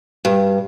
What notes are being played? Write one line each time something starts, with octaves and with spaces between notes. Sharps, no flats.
G2